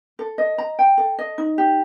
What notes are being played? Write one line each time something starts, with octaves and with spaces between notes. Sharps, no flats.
A4
D#5
A#5
G5
A4
D#5
D#4
G4